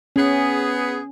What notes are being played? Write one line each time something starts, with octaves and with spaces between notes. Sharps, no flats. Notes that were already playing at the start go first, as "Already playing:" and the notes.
B3 C#4 G#4